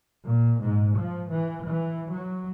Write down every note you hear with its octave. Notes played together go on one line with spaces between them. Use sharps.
A#2
G#2
F3
E3
E3
F#3